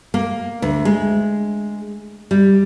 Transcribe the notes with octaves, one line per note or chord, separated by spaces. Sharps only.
A#3
D2
G#3
G3